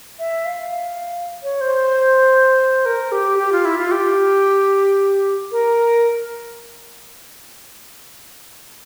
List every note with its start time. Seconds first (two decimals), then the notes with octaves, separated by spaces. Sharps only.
0.19 E5
0.45 F5
1.43 C#5
1.61 C5
2.85 A#4
3.12 G4
3.38 G4
3.52 F4
3.65 E4
3.78 F4
3.91 G4
5.52 A#4